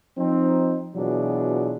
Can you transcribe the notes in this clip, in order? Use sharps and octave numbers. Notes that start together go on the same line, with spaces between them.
F3 C4 D#4
B2 E3 F#3 D4 F4 G#4